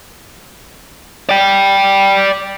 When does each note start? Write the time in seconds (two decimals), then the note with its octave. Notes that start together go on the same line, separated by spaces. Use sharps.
1.29 D5 G5